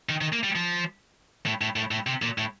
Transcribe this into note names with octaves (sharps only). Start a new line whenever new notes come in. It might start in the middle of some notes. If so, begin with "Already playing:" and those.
D#3
D#3
A#3
G3
F3
A2
A2
A2
A2
C3
A#2
A2